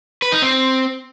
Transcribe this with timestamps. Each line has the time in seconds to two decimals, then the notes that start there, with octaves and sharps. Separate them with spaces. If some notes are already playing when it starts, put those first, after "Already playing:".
0.22 B4
0.32 D#4
0.42 C4